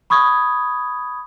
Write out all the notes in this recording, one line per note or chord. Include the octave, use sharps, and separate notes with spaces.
B5 C#6 D#6 G#6